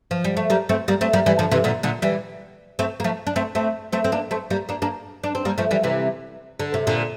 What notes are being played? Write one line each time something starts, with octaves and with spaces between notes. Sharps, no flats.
F3
G3
A3
G3 A#3
A3 C4
G3 A#3
A3 C4
G3 A#3
E3 G3
D3 F3
C3 E3
A#2 D3
A#2 D3
E3 G3
A3 C4
A#3
F3 A3
D4
A3 C4
A3 C4
A3 C4
C4
A#3 D4
A3 C4
G3 A#3
A#3 D4
A#3 D4
D4
C4
G3 A#3
F3 A3
E3 G3
C3 E3
D3
C3
A#2 D3